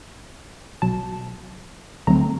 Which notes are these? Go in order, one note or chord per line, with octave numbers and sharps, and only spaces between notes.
B1 B2 F#3 A5
D2 D3 F#3 A3 C4 A#5